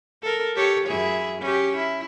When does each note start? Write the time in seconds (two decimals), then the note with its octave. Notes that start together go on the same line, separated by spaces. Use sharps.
0.22 A4 A#4
0.56 G4 A4 C#5
0.86 F#2 E4 G#4
1.41 C#4 G4
1.76 E4